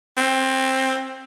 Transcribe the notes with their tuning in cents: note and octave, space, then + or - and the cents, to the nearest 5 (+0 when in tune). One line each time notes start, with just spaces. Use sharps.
C4 +15